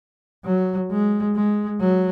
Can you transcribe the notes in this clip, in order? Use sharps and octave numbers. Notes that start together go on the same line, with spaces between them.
F#3
G#3
G#3
F#3